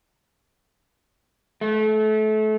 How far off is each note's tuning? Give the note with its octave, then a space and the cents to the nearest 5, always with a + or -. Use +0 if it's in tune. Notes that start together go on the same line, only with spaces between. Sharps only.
A3 -30